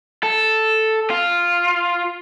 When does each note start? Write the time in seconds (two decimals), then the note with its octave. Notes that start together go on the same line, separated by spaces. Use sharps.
0.23 A4
1.10 F4